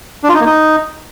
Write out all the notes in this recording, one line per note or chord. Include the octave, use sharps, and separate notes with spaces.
D4
F4
D#4
A#3
D#4